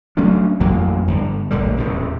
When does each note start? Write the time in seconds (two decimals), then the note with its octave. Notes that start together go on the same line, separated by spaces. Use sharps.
0.17 F#3 A3 C#4 D4
0.60 A1 F2 F#3 A#3
1.08 G1
1.51 D1 A#1 D3 G3
1.77 D#1 E2 A2 C3